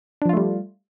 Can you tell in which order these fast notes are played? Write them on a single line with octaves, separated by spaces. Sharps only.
D4 F3 F4 A3 G3